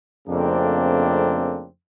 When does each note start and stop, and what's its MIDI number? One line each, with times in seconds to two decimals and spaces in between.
0.28 1.67 41
0.28 1.67 49
0.28 1.67 57
0.28 1.67 58
0.28 1.67 60
0.28 1.67 62